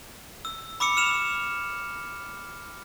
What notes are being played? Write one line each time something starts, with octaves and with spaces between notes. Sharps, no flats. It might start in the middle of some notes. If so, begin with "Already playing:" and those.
E6
B5 D6 E6 C#7
F6 E7 F7